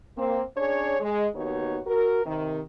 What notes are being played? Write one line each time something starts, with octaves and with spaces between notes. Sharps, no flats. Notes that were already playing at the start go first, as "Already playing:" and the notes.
A#3 C4
C#4 D4 G#4 C#5
G#3
D#2 B3 D#4 F#4 C#5
F#4 A#4
C3 D#3